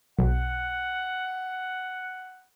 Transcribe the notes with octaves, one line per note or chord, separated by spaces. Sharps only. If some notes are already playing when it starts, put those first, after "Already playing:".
B1 F#5